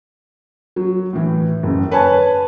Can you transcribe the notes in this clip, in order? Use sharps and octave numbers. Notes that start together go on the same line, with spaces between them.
F#3
A2 E3
F#1 C#3
B4 C#5 G#5 A5